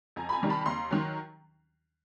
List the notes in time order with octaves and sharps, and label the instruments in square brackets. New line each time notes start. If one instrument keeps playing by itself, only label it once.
[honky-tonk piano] F2 G#5 A#5
B5
G#5 A#5
C3 D#3 G3
A5 B5
D#2 A#5 C6
D#3 F#3